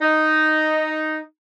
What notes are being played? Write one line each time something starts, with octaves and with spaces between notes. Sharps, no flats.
D#4